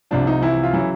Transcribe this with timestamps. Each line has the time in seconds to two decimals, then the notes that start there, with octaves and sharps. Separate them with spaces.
0.11 C2 C3 F3 D4
0.27 D#4
0.42 E3 E4
0.63 F4
0.73 C#3 E3 F#3 E4